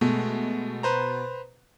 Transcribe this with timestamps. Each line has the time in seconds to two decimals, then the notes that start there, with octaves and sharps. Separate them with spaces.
0.01 B2 G#3 A3
0.83 B4 C5 A#5